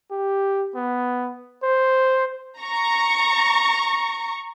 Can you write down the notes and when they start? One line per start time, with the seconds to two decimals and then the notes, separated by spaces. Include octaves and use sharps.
0.11 G4
0.75 B3
1.63 C5
2.60 A#5 C#6